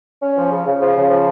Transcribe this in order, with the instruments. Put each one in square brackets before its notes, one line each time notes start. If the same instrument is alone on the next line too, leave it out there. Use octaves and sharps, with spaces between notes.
[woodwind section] C#4
F3
C#3
C#3
F3
C#3
F3